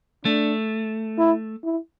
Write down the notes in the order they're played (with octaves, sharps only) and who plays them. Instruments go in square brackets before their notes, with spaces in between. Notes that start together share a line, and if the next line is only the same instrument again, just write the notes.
[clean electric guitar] A3 [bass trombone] D4
[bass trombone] E4
E4